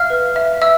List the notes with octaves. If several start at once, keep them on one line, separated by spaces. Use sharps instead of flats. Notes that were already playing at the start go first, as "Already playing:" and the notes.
Already playing: E5 F5 F6
B4
E5
E5 E6